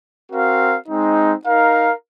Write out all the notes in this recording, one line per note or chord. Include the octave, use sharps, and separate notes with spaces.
C4 F#4 A#4 F5
G#3 C4 D#4
D#4 A#4 F5